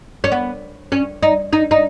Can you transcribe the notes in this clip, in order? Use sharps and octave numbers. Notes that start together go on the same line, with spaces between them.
C#4
B3
C#4
D#4
D#4
D#4